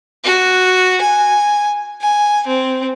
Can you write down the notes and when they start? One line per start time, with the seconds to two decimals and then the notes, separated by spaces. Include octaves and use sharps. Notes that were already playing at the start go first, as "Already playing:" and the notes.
0.24 F#4
1.01 G#5
2.01 G#5
2.47 C4